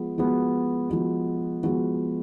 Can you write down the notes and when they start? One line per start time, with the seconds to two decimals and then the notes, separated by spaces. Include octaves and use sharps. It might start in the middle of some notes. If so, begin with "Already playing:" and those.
Already playing: F3 G#3 B3
0.18 F3 G#3 B3 F#4
0.90 F3 G#3 B3 F#4
1.63 F3 G#3 B3 F#4